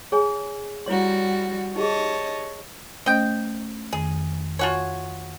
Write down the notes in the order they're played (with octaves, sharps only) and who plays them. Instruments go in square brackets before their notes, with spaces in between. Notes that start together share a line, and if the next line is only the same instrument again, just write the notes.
[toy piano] G#4 C#5 G#5
[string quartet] G3 F#4 [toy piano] E4 C#5 C6
[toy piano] D#4 G4 G#4 [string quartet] C#5 D#5 A5
[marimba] A3 C#4 C5 [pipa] D#5 G5
[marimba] F2 D#3 [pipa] G#4
[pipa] F4 F#4 C#5 [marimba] G#5 A5